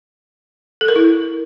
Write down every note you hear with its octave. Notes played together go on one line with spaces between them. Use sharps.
A4
A#4
E4